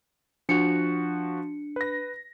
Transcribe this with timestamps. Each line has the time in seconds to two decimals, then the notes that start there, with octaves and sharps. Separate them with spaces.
0.49 F3 D4 F#4 C#7
1.76 B4 A#6